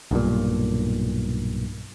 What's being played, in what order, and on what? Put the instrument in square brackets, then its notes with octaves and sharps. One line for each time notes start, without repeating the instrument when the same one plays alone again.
[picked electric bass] B1 G2 A#2